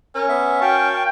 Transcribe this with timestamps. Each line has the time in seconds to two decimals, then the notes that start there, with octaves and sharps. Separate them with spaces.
0.15 C#4 A#4
0.29 B3 E5
0.61 F#4 A#4 F5 G5 A5 C#6